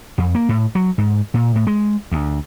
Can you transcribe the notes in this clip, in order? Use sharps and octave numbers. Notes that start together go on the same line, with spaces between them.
F2
A#3
A2
F#3
G#2
A#2
A2
G#3
D2